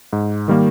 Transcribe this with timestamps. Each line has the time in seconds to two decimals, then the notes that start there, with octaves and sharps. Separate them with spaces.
0.13 G#2
0.48 D#3 G3 A#3